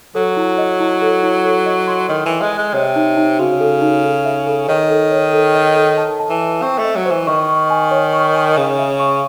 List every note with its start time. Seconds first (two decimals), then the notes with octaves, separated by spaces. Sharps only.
0.15 F#3 A4
0.37 E4
0.58 D#5
0.80 E4
1.02 A4
1.23 E4
1.45 A4
1.66 D#5
1.87 C6
2.09 D#3 D#5
2.26 E3
2.31 D#5
2.41 G#3
2.53 D#5
2.58 G#3
2.74 C3 C#5
2.96 D#4
3.17 D#4
3.39 C#3 F#4
3.60 A4
3.82 D#4
4.04 A4
4.25 E5
4.47 A4
4.68 D#3 C#5
4.90 A4
5.11 C#5
5.33 A4
5.55 D#5
5.76 A4
5.97 A5
6.20 A5
6.30 E3
6.41 A5
6.62 C4 C#6
6.78 A3
6.84 D#5
6.95 F#3
7.06 E3 C5
7.27 D#3 C#6
7.49 C#6
7.70 G#5
7.91 C#5
8.13 C#6
8.35 G#5
8.57 C#3 C#5
8.78 E5
9.00 C#6